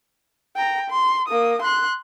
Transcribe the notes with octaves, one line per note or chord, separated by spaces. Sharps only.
G5 A#5
C6
A#3 D#6
C6 F#6